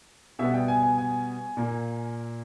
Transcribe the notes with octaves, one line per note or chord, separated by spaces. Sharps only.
B2 G3 B3 E5
G5
G#5
G#5
G#5
A#2 A#3